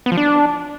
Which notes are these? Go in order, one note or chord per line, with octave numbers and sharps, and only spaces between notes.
B3
F3
D4